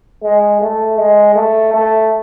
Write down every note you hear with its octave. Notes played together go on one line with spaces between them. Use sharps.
G#3
A3
G#3
A3
A3